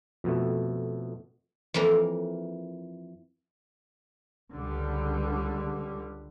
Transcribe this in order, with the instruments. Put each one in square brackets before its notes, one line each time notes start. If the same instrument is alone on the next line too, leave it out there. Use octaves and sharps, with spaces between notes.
[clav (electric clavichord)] F2 B2 A3
[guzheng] F2 E3 A#3 A#5
[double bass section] C#2 D3 G3